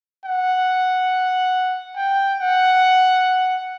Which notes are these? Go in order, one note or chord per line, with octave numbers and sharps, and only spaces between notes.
F#5
G5
F#5